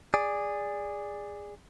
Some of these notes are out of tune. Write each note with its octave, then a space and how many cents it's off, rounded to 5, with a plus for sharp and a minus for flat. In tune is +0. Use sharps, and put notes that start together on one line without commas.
G#4 -15 D5 +0